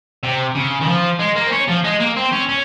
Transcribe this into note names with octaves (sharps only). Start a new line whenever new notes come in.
C3
C#3
D#3
F3
G#3
A#3
C4
C#4
F3
G#3
A#3
C4
C#4
C#4